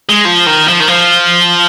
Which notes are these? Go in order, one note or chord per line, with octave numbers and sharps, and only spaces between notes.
G#3
F3
D#3
F3
D#3
F3